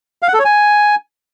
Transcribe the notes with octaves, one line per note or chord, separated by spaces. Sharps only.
F5
F#5
A4
C#5
G#5